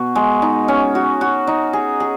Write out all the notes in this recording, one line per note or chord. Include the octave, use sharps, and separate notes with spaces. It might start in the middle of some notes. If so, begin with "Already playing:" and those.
Already playing: B2 F#4
G#3
D#4
C#4
F#4
F#4
D#4
G#4
G#4